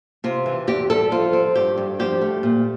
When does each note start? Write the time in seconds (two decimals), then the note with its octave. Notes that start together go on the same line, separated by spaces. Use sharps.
0.24 C3 F4
0.46 E3
0.67 E2 G4
0.90 G3 A4
1.11 F3 F4
1.33 C4
1.55 G2 G4
1.78 G2
1.99 F3 G4
2.21 A3
2.43 A#2